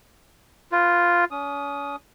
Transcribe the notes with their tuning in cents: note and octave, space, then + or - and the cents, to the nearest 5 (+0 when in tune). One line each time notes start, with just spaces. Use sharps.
F4 +0 B4 +15
C#4 +40 D#6 +0